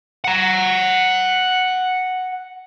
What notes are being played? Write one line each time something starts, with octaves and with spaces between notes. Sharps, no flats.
F#5 A#5